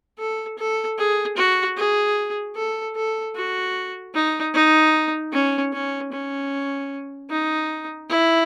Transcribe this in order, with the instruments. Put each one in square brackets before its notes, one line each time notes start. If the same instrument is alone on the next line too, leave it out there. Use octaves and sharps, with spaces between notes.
[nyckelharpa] A4
A4
G#4
F#4
G#4
A4
A4
F#4
D#4
D#4
C#4
C#4
C#4
D#4
E4